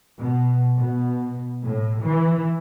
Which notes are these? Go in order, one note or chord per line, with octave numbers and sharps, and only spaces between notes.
B2
B2
A2
E3